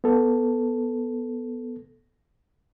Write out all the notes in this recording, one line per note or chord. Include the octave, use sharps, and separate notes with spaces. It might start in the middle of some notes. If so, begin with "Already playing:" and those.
B3 A4